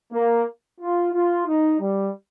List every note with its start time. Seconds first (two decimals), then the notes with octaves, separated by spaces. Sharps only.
0.13 A#3
0.80 F4
1.13 F4
1.46 D#4
1.80 G3